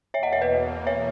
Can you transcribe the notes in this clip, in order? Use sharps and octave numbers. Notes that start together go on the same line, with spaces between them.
E2 B2 A#3 C#5 E5
D#5 F#5
C#5 E5
B4 D#5
C#5 E5